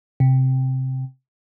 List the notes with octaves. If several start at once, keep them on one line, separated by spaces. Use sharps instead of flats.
C3